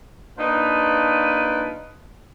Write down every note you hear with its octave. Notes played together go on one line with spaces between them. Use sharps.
A#3 D4 D#4 F4 B4